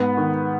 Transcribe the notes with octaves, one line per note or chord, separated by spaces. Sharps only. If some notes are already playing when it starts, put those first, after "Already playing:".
Already playing: G#2 B3
D#3